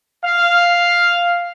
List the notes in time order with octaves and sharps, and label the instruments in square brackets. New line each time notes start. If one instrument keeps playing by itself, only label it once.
[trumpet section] F5